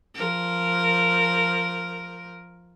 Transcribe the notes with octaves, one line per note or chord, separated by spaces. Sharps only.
F3 A#4